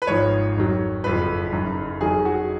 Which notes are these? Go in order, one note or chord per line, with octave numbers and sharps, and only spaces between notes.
B4
G#1 G#2 F3 C#5
F2 D#3 F#3
F#1 F2 F3 B4
F#1 F#2 D#3
F2 D#3 F#3 G#4
F#4